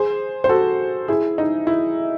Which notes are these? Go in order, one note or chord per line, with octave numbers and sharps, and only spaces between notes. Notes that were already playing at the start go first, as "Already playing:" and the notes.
Already playing: G#4 C5
C5
F#4 A4
E4 G#4
D#4
E4